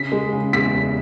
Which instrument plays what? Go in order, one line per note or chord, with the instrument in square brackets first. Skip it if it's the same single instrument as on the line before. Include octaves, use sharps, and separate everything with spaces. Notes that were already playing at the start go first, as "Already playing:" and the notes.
Already playing: [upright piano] C#3 B6
G#3
C#3
E2 B6
C#3